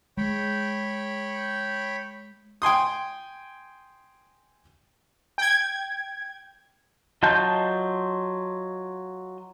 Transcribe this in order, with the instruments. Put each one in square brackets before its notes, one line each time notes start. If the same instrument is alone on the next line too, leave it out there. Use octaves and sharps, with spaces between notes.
[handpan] G#3 [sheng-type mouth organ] C#5 G5 B5
[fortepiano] G5 G#5 C6 D#6
[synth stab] G5 G#6
[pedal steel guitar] F#3 F4 D#5 A5 G6